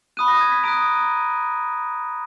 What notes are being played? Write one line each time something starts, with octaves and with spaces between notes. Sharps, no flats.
B5 D#6 F#6 D#7
A#6
G#6
B6
A#5 D#6 F#6 D7
D#7